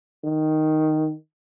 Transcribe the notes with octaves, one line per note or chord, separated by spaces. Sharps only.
D#3